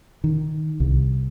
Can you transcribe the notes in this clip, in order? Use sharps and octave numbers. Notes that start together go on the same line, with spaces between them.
D#3
C2